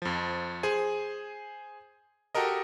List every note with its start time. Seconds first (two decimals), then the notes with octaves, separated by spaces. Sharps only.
0.02 F2 F3
0.63 G#4 C5 G#5
2.35 F#4 G4 A4 A#4 D#5